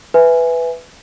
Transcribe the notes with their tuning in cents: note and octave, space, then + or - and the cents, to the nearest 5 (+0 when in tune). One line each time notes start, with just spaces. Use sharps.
B4 +5 E5 +0 G#5 +0